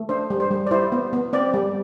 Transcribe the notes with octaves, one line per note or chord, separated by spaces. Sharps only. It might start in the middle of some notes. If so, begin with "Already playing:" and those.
Already playing: A3
D4 C5
G3
C5
G3
D5
E4 C5
B3
B3
C4 D5
G3